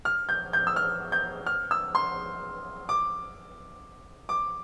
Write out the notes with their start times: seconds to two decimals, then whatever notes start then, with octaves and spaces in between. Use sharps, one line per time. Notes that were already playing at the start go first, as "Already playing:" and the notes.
0.05 F6
0.29 G6
0.53 G6
0.67 E6
0.76 F6
1.12 G6
1.46 F6
1.71 E6
1.95 C6
2.89 D6
4.29 D6